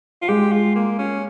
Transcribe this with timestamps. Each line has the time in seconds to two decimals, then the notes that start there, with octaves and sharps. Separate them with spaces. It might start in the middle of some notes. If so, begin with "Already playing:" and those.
0.22 F4
0.29 G#3 G4
0.52 F4
0.75 A#3
0.99 C#4